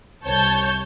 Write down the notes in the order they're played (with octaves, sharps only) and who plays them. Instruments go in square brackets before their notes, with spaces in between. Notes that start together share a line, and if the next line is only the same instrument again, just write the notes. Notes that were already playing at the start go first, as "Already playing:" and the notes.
[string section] C2 C#5 A5 G6